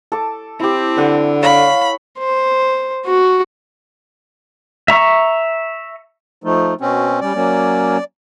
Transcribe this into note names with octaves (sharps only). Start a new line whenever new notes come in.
A4 D6
C4 E4 G4
D3 F#5
C#5 F5 B5
C5
F#4
E5 A#5 C#6
F3 A3 D#4
B2 C4 C#4 F#4
G3 C#4 D5
F#3 A#3 C#4